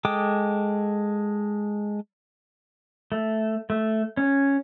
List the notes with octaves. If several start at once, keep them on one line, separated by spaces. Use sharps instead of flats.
G#3 A4 G5 D6 D#6
A3
A3
C#4